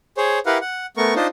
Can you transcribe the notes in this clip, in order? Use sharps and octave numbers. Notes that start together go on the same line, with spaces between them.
G#4 C5 C#5
E4 G4 A#4 B4 F5 F#5
F#5
A3 B3 A#4 C#6
D4 D#4 F4 C5